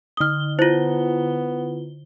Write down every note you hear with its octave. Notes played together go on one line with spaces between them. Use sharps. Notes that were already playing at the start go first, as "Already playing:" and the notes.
D3 D#6 F6 G7
B3 E4 F4 C5